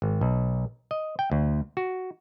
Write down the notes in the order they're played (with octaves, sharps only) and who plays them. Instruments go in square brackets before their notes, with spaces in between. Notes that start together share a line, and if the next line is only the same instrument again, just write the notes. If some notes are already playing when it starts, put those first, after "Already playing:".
[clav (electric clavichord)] G#1
B1
D#5
G5
D2
F#4